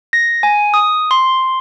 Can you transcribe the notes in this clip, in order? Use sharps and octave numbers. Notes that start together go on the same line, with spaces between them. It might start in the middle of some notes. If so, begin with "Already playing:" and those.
A#6
G#5
D#6
C6